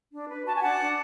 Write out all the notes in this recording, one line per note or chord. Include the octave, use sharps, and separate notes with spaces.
D4
B4
F#4 A5
G#5
D4 F#5 A5
D4